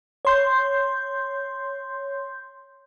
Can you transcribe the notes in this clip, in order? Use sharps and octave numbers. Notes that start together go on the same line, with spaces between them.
C#5 C6 G6